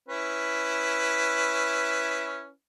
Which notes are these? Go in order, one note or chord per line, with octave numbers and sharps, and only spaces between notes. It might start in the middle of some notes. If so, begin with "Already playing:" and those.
C#4 E4 B4